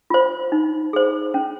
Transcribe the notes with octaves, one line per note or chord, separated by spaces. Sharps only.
F4 C5
D#4
G#4 C5
C#4